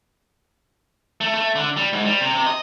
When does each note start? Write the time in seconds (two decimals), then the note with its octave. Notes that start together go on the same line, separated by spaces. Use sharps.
1.21 A3
1.34 A3
1.55 D3
1.76 G3
1.93 G#2
2.05 G3
2.20 C3
2.33 C3
2.46 D#5